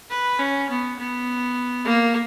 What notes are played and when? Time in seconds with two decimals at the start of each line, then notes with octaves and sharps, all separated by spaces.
0.10 B4
0.39 C#4
0.69 B3
0.98 B3
1.85 A#3